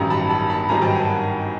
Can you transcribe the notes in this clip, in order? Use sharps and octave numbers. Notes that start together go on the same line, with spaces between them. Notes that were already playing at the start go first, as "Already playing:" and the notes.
Already playing: A1 G2 D#3 F#3 G#5 A#5
A5 B5
A5 B5
A5 B5
G#1 G2 D#3 F#3 G#5 A#5
G5 A5
F#5 G#5